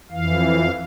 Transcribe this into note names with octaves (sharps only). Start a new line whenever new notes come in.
F2 E3 F5